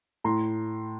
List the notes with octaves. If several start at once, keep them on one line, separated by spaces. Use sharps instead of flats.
A2 A#5 C6